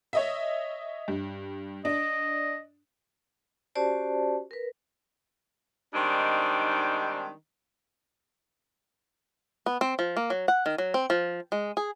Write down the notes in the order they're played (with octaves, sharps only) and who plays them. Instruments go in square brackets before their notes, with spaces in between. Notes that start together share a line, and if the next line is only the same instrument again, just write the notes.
[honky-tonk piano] C#5 D#5 E5
G2
[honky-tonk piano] D4 [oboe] D#5
[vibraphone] C#4 F#4 G4 C5 D5 A5
A#4 B4
[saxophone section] D#3 G3 G#3 C4 D4 D#4
[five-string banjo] B3
C4
F3
A#3
F#3
F#5
D#3
F#3
C4
F3
G#3
G#4